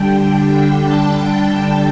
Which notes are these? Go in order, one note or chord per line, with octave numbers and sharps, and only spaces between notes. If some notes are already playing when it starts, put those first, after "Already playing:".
Already playing: D3 G3 D4 G5
A5
G5